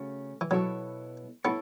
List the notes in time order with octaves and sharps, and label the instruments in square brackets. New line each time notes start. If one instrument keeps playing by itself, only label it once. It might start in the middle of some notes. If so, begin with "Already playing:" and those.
Already playing: [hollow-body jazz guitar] C#3 A3 C#4 F#4
[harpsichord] E3
[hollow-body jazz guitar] B2 B3 E4 A4 C#5 [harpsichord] F#3
[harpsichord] B3 [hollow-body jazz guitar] E4 A4 C#5